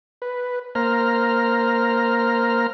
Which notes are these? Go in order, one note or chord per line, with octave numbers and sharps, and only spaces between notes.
B4
A#3 C5 A#5 F6